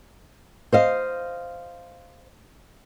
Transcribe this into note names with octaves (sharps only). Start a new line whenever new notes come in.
C5 D#5 F5